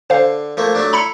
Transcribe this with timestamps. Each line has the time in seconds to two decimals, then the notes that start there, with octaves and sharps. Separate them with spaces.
0.10 D3 C5 F5
0.57 F3 A3 A#3
0.75 F#3 A3 D4
0.93 E4 A#5 B5 C#7